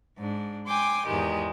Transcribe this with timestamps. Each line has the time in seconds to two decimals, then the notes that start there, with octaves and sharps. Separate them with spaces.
0.18 G#2 D4
0.68 G5 G#5 C6 D6
1.07 E2 G#2 D#3 G#3 G4